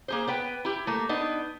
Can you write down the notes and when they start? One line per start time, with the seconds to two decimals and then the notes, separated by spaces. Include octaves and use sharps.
0.08 A#3 G#4 C5
0.27 B3 B4 G5
0.65 E4 G4
0.87 A3 A#3
1.09 B3 D4 D#4